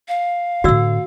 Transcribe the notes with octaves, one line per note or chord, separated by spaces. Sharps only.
F5
A2 D3 F#4 D5 E6